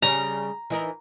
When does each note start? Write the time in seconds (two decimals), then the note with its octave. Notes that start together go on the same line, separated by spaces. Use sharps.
0.02 C#3 G3 C#4 A#5
0.70 E3 D#4 A#4